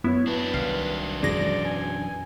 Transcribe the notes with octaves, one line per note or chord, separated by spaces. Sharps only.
F#2 B3 E4 C#5
F#3 D4 B4
C2 D#3 F5
G#1 F#2 B2 E3 G#4 D5 A#6
G#5